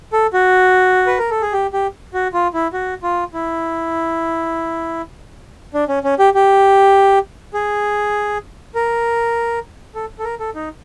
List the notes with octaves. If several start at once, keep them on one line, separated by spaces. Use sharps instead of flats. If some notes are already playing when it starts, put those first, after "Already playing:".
A4
F#4
B4
A#4
A4
G#4
G4
G4
F#4
F4
E4
F#4
F4
E4
D4
C#4
C#4
G4
G4
G#4
A#4
A4
A4
A#4
A4
D#4